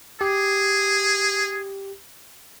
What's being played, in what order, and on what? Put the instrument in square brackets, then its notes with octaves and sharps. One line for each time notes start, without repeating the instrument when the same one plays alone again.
[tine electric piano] G4 [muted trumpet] G#4